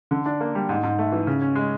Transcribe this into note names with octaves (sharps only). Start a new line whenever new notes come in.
D3
D4
A#3
G3
G#2
G#2
A3
E3
C#3
C#4
G#3